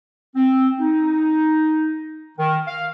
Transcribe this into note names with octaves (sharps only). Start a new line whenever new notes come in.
C4
D#4
D#3
F5